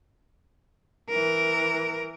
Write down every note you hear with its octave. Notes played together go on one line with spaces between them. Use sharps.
E3 A#4